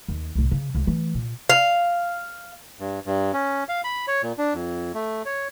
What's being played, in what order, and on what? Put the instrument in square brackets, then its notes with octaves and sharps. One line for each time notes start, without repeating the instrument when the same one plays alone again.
[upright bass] D#2
C2 A2
C#3
C#2 D3
E3 A3
A#2
[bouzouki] F5
[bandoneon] G2
G2
C#4
F5
B5
C#5
A#2
D4
F2
A3
C#5